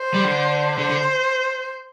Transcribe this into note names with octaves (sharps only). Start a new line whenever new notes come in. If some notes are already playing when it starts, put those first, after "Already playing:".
Already playing: C5
G3
D3
D3 C5
D3